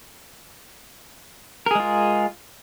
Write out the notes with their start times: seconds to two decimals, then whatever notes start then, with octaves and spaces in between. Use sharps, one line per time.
1.66 A#4
1.71 G#4
1.75 G#3
1.80 F4